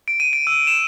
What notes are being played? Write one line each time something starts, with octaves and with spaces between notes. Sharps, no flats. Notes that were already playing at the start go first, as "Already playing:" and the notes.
D7
D#7
D7
E6
E7